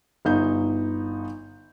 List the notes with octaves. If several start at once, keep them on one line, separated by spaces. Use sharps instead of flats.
G1 D#4 G6